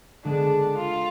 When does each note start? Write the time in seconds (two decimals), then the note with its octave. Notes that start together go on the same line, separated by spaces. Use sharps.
0.24 D3 G#3 B3 D4
0.77 F4